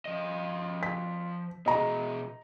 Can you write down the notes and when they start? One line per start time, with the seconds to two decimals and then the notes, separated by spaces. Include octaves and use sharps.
0.05 F3 D#5
0.83 B6
1.66 B2 G#4 D#5 A#5